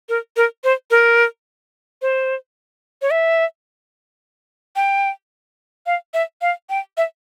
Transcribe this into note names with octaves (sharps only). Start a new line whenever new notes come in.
A#4
A#4
C5
A#4
C5
C#5
E5
G5
F5
E5
F5
G5
E5